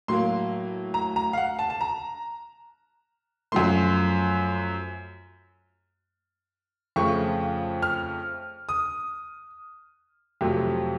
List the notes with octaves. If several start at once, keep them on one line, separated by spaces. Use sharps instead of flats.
A2 F#3 A#3 C6
A#5
A#5
F5
F#5
A5
A5
A#5
F#2 F3 A3 C6
F2 C#3 F3 A3 C#6
F6
D#6
F2 C3 F#3 A3